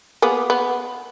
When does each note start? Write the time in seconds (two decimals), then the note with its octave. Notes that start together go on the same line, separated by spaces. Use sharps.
0.22 A#3 B3 G#4
0.50 B3